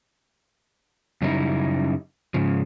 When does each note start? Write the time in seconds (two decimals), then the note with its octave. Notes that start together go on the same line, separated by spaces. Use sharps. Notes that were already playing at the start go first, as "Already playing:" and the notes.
1.22 F#2 C#3 G3 C4 D#4 E4
2.34 G#2 C#3 F3